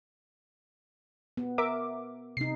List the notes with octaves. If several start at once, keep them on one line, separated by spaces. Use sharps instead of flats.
B3
A#4 E5 D6
C3 D#4 C7